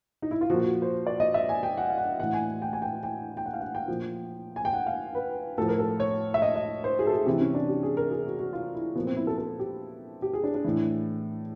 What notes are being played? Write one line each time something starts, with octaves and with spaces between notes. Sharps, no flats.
D#4
E4
F4
A#2 F3 F#4
F#4
C5
D5
D#5
E5
G#5
G5
F#5
F5
F#5
A2 E3 F#5
G#5
G5
G#5
G5
G5
G5
F#5
F5
F#5
G5
A#2 F3
G#5
G5
F#5
F5
B4
A2 F3 A4
A#4
A4
C#5
E5
D#5
D#5
C5
G#4
A4
G#4
C3 E3 G4
C#4
D4
G4
G#4
A#4
G#4
F#4
F#4
F4
E4
A#2 F3 B3
C4
E4
A4
A4
G4
G4
G#4
D4
D4
A2 E3